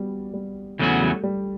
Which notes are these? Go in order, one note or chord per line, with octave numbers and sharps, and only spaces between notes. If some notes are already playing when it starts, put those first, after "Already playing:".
Already playing: G3 B3 F#4
G3
E2 C#3 F#3 A3 B3 F#4
G3
G3